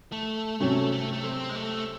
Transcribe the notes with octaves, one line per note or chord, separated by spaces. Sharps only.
A3
C3 F#3 A3 C#4
A3
A3
C4
G#3
A3